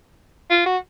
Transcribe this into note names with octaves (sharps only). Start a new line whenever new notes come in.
F4
F#4